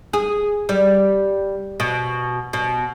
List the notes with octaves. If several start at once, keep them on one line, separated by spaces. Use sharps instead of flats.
G#4
G3
B2
B2